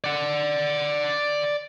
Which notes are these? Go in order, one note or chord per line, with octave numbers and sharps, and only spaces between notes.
D5 F#5